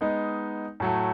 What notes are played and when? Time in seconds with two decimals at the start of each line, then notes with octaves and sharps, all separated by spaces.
0.01 G#3 B3 D#4
0.80 A2 F#3 A3